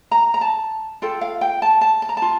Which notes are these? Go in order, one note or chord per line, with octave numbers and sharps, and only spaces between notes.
A#5
A#5
A5
F4 A4 G5
F5
G5
A5
A5
A5
A#5
F4 A5